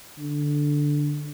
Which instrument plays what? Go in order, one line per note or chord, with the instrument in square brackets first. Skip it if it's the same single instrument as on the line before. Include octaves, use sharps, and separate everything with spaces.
[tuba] D3